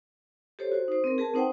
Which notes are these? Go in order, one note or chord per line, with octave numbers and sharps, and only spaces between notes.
G4 A4 C5 C#5
F#4 C5
D#4 C5
C4 A#4
G#4 A#4 B4 A5
C4 D#4 C5 F#5 G5